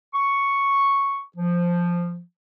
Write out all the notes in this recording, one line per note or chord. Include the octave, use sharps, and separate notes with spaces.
C#6
F3